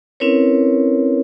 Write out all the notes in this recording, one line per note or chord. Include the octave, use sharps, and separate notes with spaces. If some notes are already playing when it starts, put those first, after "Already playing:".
C4 C#4 E4 A#4 B4 C#5